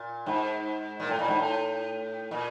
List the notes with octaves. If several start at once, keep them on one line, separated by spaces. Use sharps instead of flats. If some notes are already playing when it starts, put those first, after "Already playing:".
Already playing: A#2
G#2
A#2
A2
A#2
G#2
A2
A#2